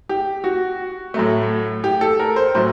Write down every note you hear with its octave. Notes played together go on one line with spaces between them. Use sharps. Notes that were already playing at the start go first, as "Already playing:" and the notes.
G4
F#4
A2 F#3 A3
G4
A4
A#4
C5
A2 F#3 A3 C5